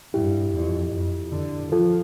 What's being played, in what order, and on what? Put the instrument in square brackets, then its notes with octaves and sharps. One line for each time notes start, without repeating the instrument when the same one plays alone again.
[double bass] G2 [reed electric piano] E4 G4
[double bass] F2
F2
D3
[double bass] F3 [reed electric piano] F4 A4